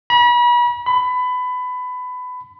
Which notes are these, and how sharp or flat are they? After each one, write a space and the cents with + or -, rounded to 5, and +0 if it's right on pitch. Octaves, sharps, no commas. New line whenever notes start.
B5 -40
B5 +20